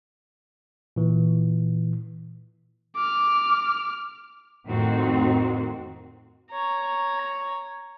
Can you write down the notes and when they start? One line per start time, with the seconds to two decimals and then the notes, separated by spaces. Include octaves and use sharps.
0.96 A#2 E3
2.96 D6 F6
4.68 F2 A2 D#3 C4 F#4
6.50 C#5 A#5